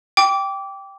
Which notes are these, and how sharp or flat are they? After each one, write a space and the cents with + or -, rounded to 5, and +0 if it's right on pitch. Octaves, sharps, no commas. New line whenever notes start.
G5 +0 D6 -20